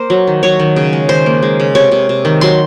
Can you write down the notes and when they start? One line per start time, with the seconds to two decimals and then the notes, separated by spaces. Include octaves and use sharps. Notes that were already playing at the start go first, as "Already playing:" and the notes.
Already playing: A#3 C5
0.10 F#3
0.27 D#3
0.43 F#3 C#5
0.60 D#3
0.76 C#3
0.93 G#3
1.09 D#3 C5
1.26 A#3
1.42 G#3
1.60 C#3
1.75 C3 C#5
1.91 C3
2.09 C3
2.25 D#3
2.41 F#3 C6